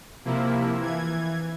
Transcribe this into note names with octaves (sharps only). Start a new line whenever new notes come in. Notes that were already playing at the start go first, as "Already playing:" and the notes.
C3 F3 A#3 E4
E3 G#6